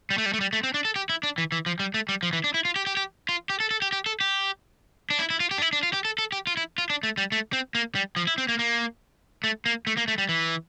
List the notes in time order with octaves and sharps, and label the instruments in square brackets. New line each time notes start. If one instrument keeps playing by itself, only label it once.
[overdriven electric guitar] G3
A3
G3
A3
G3
A3
C4
D4
A4
G4
E4
D4
E3
E3
F3
G3
A3
G3
F3
E3
D4
E4
F4
G4
G4
G4
F4
G4
A4
A4
G4
G4
A4
G4
D4
E4
E4
F4
G4
D4
E4
D4
F4
G4
A4
A4
G4
F4
E4
F4
D4
A3
G3
A3
C4
A#3
G3
F3
E4
C4
A#3
A#3
A3
A#3
A3
A#3
A3
G3
E3